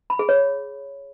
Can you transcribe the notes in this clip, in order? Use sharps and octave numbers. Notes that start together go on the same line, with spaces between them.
B5
G#4
C#5